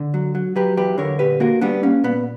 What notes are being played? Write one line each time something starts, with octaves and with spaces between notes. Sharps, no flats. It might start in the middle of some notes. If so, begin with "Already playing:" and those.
Already playing: D3
F#3
F#3
F#3 G4 B4
E2 G4 B4
D3 A#4 C#5
A#2 G4 B4
A#3 F#4 A#4
G3 B3 D4
A#3 C#4
A#2 B3